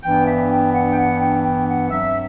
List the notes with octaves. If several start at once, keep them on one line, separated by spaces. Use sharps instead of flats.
G2 E3 B3 D4 G5
E5
G5
F#5
G5
F#5
G5
G5
F#5
G2 F#3 C4 E5